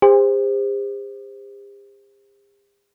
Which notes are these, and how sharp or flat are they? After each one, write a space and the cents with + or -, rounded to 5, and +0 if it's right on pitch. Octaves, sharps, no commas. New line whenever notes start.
G4 +45 C5 +0